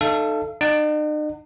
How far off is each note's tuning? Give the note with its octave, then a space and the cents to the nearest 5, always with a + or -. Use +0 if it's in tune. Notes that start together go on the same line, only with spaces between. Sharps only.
D#4 -35 A4 +0 F5 -40
D#4 -45 F#5 +0